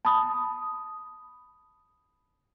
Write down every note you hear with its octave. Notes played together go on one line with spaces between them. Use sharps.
A5 B5 D#6